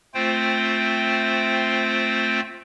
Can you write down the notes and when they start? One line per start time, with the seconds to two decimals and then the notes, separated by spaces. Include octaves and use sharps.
0.14 A3 C4 F4 C5 G5